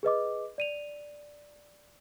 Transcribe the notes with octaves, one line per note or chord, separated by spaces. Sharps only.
G#4 B4 D#5 D6
D5 D#7 F7